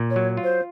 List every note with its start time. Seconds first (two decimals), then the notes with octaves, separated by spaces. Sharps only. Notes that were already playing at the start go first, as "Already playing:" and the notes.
Already playing: A#2
0.10 C#5
0.16 F#3
0.37 F4
0.43 C5